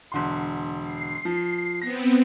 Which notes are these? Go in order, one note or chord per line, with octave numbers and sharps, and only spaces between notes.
E1 D3 C6
C7
F3
B3 C4 A#6